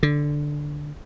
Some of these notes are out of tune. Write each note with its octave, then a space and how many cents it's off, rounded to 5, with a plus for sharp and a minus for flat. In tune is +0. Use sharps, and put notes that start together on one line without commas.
D3 +0